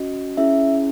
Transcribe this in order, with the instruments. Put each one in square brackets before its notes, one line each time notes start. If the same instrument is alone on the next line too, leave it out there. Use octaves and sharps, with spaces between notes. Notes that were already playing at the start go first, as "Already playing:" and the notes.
Already playing: [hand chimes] C#4 F#4 D#5
C#4 E4 G#4 E5